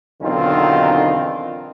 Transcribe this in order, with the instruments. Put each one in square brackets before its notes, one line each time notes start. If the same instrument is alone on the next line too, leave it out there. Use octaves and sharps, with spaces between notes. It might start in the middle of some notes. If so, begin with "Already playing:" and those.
[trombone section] B1 E2 D3 D#3 C4 F4